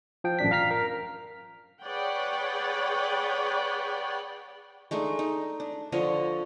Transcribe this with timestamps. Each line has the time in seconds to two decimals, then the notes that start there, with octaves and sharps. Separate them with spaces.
0.24 F3 G5
0.39 A1 F#2 D4 B6
0.51 F5 A#5 F6 B6
0.71 A#4
1.84 G#4 B4 C#5 D5 F#5 G5
4.91 G#3 A3 D4 D#4
5.19 D#4
5.60 D4
5.92 D3 F3 C#5 D#5